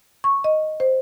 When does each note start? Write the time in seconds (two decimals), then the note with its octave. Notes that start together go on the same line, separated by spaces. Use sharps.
0.24 C#6
0.44 D#5
0.80 C5